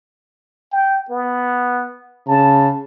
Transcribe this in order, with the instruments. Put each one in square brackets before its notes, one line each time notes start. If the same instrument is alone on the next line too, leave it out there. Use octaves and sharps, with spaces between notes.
[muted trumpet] G5
B3
[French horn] C#3 [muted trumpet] A5